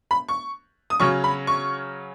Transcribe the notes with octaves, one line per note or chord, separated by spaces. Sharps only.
B5
C#6
D#6
C#3 F#3 C#4 C#6
B5
C#6